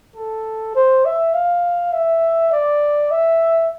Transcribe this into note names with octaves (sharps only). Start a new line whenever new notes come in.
A4
C5
E5
F5
E5
D5
E5